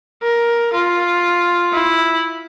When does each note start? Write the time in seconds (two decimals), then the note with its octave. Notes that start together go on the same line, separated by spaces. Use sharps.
0.23 A#4
0.73 F4
1.72 E4